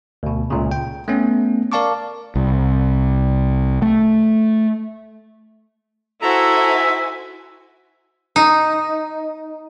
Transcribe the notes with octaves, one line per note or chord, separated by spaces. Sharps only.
D2 B2
C#2 A#2 C#3
G5
A3 B3 C#4
A#4 D5 F5 A5 C#6 D6
C2
A3
E4 F#4 A4 C5 E5 G#5 A#5
D#4